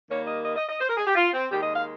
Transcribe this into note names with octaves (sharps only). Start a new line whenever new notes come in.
D#2 D#3 G3 A#3 C#5
D#5
D#5
D#5
D#5
C5
A#4
G#4
G4
F4
C4
D#2 D#3 G#3 G4
D#5
F5